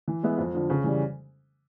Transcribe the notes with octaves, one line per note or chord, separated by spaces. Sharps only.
E3
G#3 B3 E4
F2
D3 F3
C#3
E3 G3